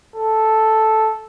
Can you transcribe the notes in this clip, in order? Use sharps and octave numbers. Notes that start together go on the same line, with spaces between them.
A4